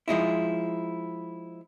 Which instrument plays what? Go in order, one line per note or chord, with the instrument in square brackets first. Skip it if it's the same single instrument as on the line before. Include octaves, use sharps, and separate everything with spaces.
[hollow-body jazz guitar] F3 G#3 D#4 E4